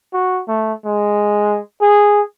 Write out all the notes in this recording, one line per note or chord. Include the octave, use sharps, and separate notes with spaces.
F#4
A3
G#3
G#4